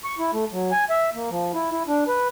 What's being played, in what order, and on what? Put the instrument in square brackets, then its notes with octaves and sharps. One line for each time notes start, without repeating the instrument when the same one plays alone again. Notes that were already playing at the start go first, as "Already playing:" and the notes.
[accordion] C#6
E4
A3
F#3
G#5
E5
A#3
F3
E4
E4
D4
B4